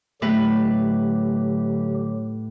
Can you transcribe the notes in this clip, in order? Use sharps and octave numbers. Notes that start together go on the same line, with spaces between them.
A2 D3 F#3 G4 B4